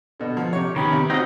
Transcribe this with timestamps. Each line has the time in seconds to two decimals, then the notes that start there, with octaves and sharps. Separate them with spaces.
0.20 B2 D3
0.37 F3 F#5
0.53 C3 G4 C#5
0.76 D#3 B3 C#4 G4 B5
0.93 C3
1.10 C4 D#4 F4 F#4 C5 D#5